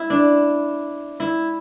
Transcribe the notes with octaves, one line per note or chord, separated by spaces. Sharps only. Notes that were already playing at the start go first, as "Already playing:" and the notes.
Already playing: E4
D4
E4